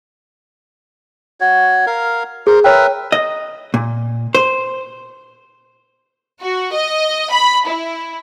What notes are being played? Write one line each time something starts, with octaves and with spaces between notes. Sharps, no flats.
F#4 C#5
A#4 F5
G#4 A#4 C5
A#4 B4 C#5 E5 G5
D#5
A#2
C5
F#4
D#5
B5
E4